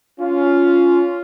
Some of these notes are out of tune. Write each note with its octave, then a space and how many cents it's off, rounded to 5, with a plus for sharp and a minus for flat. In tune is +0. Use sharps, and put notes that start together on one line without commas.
C#4 +20 F4 +0